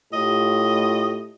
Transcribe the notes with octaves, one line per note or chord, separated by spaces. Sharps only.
A2 F4 G4 D#5